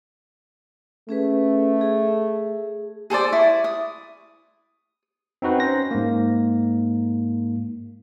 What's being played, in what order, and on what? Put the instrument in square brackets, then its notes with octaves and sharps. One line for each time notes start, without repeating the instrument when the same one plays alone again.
[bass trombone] A3 [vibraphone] C#4 G#4 B4
[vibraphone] G#4
[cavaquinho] G#4 A4 C5 D5
E4 D5 C#6
D#6
[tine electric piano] C4 D#4 F#4 B4
C#4 C5 A#6
G#2 A#3